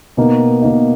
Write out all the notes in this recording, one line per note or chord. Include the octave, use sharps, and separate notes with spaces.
B2 A#3 D#4
B2 A#3 D#4